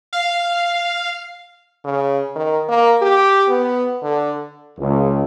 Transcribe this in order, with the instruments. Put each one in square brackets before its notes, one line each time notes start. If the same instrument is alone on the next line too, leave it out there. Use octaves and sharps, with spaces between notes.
[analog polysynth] F5
[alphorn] C#3
D#3
A#3
G4
B3
D3
[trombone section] C#2